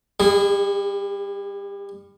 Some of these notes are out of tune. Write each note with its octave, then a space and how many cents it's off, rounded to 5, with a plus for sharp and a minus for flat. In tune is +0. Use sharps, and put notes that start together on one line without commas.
G3 +30 G#4 -20 D#5 -30